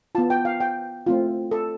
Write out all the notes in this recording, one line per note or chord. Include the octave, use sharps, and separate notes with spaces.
B3 F4 A5
G5
F5
G5
A3 C4 F4
A4